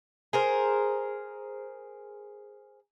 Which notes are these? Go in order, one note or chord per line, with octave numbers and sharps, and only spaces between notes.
G#4 A#4 C5